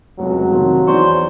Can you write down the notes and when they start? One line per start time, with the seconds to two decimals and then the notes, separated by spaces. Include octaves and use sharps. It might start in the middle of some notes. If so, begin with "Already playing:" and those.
0.19 F1 C#2 F#3
0.52 C3 D#3 F3
0.87 E2 C5 D5 C#6